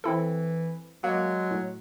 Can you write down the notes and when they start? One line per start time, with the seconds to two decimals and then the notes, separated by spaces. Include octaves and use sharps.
0.04 E3 C4 E4 A4
1.04 F#3 G#3 A#3
1.51 A2